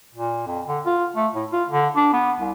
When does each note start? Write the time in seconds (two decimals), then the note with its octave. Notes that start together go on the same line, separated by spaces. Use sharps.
0.15 A#2
0.47 F2
0.67 D3
0.86 F4
1.16 A3
1.35 A2
1.52 F4
1.69 D3
1.96 D4
2.13 B3
2.40 C2